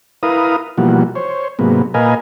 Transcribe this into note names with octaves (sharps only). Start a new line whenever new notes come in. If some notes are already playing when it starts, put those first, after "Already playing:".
E4 A#4 B4 F5 D#6
B2 E3 F3 G3 A#3 F#4
C5 C#5
G#2 C3 F#3 A#3 B3
A#2 A#4 B4 D#5 F5 G#5